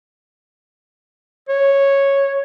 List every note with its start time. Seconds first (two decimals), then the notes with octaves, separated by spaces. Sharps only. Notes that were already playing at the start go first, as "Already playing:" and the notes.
1.49 C#5